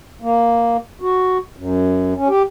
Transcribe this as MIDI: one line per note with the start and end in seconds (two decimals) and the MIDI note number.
0.22 0.77 58
1.01 1.38 66
1.57 2.14 42
2.16 2.28 61
2.28 2.43 67